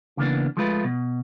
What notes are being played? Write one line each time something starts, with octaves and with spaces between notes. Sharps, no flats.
C#3 E3 A#3 B3 D4
F3 G#3 A3 F4 B4
B2